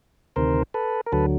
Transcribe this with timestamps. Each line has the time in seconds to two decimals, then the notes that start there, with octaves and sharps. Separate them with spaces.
0.36 D2 C3 D#3 A#4 C5
0.74 A4 B4
1.06 A#4
1.12 D2 D3 F#3 A4 B4